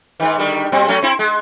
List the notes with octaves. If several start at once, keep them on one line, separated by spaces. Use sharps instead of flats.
G#2 D#3
D3 D#3 G3
A#2 G3 C4
F#3 A3 C#4
C4 E4
G#3